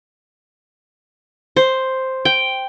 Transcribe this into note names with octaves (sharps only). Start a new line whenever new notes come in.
C5
G5